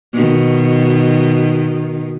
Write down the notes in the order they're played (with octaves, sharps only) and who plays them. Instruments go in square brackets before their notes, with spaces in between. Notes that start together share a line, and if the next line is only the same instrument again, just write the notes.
[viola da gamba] B2 D#3